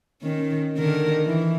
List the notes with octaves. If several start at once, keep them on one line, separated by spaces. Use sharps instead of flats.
D#3 C#4
D3 D#3 A#4
E3